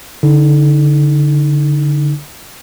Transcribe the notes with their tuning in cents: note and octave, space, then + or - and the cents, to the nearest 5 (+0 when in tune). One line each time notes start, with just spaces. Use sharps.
D3 -15 D#4 +25